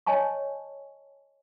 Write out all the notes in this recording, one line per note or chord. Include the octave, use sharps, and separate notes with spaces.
C#5 D#5 G#5 A5 C#6